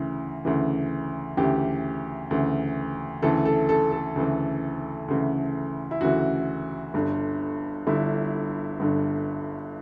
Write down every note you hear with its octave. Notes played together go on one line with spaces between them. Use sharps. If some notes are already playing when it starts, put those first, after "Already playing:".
Already playing: D2 C#3 E3
D2 C#3 E3
D2 C#3 E3 G4
D2 C#3 E3
D2 C#3 E3 A4
A4
A4
A4
D2 C#3 E3
D2 C#3 E3
E4
D2 C#3 E3 F#4
G1 G2 D3
G1 G2 D3 E4
G1 G2 D3